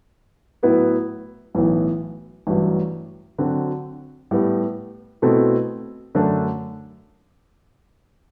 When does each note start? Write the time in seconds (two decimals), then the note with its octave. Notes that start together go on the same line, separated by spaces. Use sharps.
0.63 A2 F#3 B3 E4 B4
1.55 B1 A2 E3 B3
2.47 A1 G2 F#3
3.38 D3 F#3 C4 F#4
4.31 A2 G3 B3
5.22 B2 A3 C4 E4 A4
6.15 F#2 D3 A3 D4